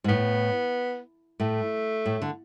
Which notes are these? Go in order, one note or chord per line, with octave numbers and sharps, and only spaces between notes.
G#2
A2 B3
A2 A3
A2
D3